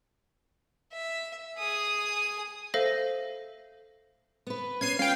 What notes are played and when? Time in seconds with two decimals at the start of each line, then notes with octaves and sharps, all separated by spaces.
0.93 E5
1.58 G#4 D#6
2.74 A4 C5 E5 F5 A#6
4.47 B3 B4
4.81 B3 C#4 G#6 C7 D#7
4.99 C#4 F4 F5 G5